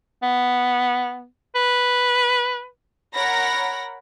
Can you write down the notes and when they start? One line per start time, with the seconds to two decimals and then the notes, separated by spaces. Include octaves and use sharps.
0.23 B3
1.55 B4
3.14 A#4 C#5 F#5 B5 A#6